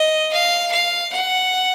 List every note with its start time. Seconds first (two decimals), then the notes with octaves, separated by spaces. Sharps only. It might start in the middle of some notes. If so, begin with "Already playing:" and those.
Already playing: D#5
0.33 F5
0.72 F5
1.12 F#5